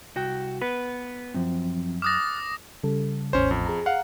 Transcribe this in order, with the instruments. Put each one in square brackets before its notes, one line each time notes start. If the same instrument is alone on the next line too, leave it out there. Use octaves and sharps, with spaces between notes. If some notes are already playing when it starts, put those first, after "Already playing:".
[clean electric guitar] C2 F#4 G5
B3 B4
[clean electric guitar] F#2 [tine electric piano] F3 C4
[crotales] D6 D#6 A#6 [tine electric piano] F6 F#6 A6
[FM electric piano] C#3 G3 A4
[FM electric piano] A1 E2 A2 [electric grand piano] C#4 C5
[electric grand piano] F2
[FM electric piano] G#4 A#5
[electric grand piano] F5 F#5